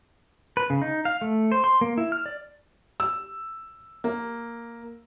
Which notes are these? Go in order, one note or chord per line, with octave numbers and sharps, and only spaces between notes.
B4
C#3
D#4
F5
A3
C5
C6
A#3
E4
F6
D5
E6
A#3